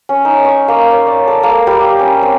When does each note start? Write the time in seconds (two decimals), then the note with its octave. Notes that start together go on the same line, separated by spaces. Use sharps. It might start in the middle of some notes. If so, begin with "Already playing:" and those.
0.09 C#4
0.25 D#4
0.45 C#6
0.68 A#3
0.91 C#5
1.07 D5
1.28 A4
1.43 A#3
1.67 G3
1.99 C#4
2.22 C4